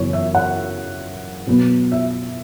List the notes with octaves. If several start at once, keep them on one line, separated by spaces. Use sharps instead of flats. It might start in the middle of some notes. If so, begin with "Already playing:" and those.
Already playing: F#2 C#3 E3 B3 C#5
E5
F#5
B2 F#3 B3
E5